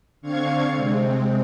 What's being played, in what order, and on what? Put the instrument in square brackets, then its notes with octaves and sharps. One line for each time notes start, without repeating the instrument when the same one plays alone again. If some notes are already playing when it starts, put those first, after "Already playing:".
[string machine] D3 C4 D4 F5 C#6 G#6
C3 G#3 C4